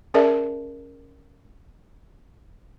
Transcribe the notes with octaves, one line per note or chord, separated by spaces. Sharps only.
C#4 G#4 A#4 D5 E5 A5